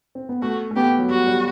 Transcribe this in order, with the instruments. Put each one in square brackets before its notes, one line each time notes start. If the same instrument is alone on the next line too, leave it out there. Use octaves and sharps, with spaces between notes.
[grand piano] C4
B3
[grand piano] A3 [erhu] F#4
[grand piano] A3
[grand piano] B3 [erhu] G4
[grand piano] F#3
[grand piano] G3 [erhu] F#4
[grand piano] G3